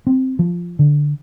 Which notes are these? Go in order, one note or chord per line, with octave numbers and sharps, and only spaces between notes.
C4
F3
D3